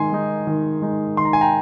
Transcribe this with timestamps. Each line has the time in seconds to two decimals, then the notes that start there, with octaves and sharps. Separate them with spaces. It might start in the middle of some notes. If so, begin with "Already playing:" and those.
Already playing: D#3 G#3 D#4 G#5 C6
0.12 G#3 D#4
0.47 D#3
0.82 G#3 D#4
1.17 D#3 C6
1.25 A#5
1.33 G#5
1.41 G5 A#5